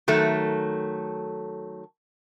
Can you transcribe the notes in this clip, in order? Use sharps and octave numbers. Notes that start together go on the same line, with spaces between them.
D#3 F#3 A3 A4